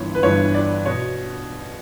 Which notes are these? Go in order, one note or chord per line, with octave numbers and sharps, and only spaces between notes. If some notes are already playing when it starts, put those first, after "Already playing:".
Already playing: G1 G2 E3 C#5
B4
G1 G2 E3 C#5
D5
B2 C#5